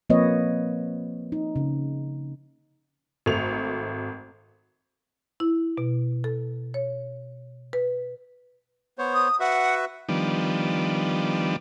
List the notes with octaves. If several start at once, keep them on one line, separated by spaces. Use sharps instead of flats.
F3 A#3 C4 B4 C#5 D#5
D#4
C#3
G#1 A3 F7
E4
B2
A4
C#5
B4
B3 C5 C#5
D#6
F#4 B4 E5 F#5
D#3 F3 G3 B3 D4